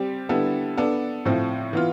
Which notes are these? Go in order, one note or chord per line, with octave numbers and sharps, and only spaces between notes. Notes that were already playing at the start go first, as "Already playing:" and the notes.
Already playing: G3 C4 G4
D3 G3 B3 E4 A4
B3 D4 A4 D5
A2 F3 C4
E3 B3 F4